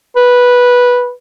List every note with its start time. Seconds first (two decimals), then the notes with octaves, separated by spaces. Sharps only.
0.16 B4